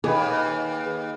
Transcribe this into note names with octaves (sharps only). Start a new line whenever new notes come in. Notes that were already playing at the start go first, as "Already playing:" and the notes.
D#2 G#4 B4